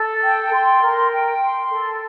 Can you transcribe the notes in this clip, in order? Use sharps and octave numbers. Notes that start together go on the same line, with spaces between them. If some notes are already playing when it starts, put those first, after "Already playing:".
Already playing: A4
G5
C6
A#4
G5
C6
A4